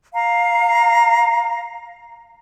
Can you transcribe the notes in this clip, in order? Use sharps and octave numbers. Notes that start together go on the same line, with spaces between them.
F5 A#5